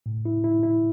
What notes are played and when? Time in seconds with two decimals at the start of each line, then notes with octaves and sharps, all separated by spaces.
0.06 A2
0.25 E4
0.44 E4
0.63 E4